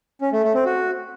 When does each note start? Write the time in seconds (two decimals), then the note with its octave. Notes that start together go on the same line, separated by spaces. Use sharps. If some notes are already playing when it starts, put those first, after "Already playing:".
0.21 C#4
0.32 A3
0.43 A3
0.54 C4
0.65 F#4